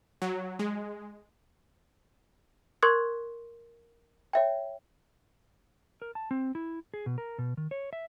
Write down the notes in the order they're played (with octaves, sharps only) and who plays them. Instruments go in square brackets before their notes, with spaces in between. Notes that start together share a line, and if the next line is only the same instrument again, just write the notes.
[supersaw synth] F#3
G#3
[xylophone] A#4 C6 C#6 D#6 F#6 G#6
C#5 E5 G5
[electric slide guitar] A#4
A5
C4
E4
G#4
B2
A#4
B2
D#3
C#5
E5